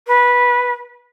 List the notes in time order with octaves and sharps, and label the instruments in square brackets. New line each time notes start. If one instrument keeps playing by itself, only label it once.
[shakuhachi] B4